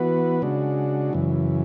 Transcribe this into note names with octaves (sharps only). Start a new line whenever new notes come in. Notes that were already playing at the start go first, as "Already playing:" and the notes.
Already playing: E3 B3 F#4 B4
C#3 G#3 D4 F#4
F#2 C#3 E3